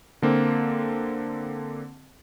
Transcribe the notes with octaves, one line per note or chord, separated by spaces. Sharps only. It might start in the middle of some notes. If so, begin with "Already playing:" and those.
D3 A#3 C4